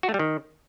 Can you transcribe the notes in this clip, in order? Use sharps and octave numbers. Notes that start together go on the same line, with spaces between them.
F#4
A3
G3
D#3